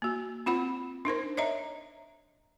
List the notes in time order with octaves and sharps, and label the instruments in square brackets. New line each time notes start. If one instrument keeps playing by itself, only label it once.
[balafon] A#3 F#4
C4 F4 F#5 B5
D4 D#4 A#4 C5
C#5 D#5 E5 A#5